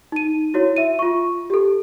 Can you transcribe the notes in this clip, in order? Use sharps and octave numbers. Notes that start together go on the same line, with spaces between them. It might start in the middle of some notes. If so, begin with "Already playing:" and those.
D#4 D#7
E4 F#4 C#5
E5 D#7
F4 C#6
G4 A4